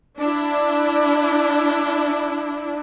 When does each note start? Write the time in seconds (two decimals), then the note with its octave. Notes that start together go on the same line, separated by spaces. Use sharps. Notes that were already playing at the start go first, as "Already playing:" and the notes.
0.19 D4 E4